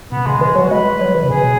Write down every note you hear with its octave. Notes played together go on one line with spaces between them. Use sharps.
B2 B3
C#3 G#3
E3 G#3
F#3 F#4
G#3 B4
F#3
E3
C#3
B2 G#4